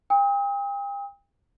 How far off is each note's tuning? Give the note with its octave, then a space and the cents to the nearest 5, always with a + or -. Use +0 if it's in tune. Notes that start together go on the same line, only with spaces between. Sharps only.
G5 +40 D#6 +40